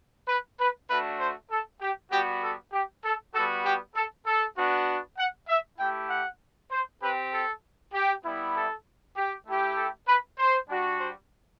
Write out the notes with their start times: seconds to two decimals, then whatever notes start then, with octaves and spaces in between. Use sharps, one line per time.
0.28 B4
0.59 B4
0.89 A3 D4 F#4 B4
1.19 C5
1.51 A4
1.81 G4
2.12 G3 B3 F#4 G4
2.43 A4
2.72 G4
3.04 A4
3.34 G3 B3 F#4 A4
3.65 G4
3.95 A4
4.26 A4
4.57 B3 D4 F#4
5.18 F#5
5.48 E5
5.79 A3 E4 G4 G5
6.10 F#5
6.71 C5
7.01 C4 G4 B4
7.32 A4
7.93 G4
8.24 G3 B3 E4
8.54 A4
9.16 G4
9.47 A3 E4 G4
9.77 A4
10.08 B4
10.39 C5
10.69 G3 D4 F#4
10.99 C5